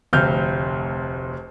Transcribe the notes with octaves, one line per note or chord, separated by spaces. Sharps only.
F1 D2 F6 G6